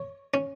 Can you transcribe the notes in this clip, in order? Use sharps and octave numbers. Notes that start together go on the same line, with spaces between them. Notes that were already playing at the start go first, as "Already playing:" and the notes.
Already playing: C#5
C#4